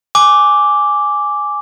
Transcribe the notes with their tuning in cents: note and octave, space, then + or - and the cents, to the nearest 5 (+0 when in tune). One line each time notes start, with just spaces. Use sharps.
G#5 +0 D6 -5